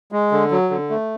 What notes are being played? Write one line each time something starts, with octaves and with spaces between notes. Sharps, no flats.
G#3
D3
F#3
D3
A3